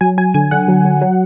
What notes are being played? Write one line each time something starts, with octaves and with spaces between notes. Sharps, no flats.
F#3 G#5
F#3 G#5
D3 G#5
D3 F#5
F#3
F#3
F#3